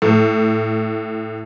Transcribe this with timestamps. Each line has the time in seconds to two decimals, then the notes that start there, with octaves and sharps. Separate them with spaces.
0.02 A2